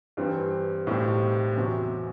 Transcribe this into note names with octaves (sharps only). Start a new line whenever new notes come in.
G2 E3 G3 C4
B1 A2 G3 C4
E2 C3 F#3 C4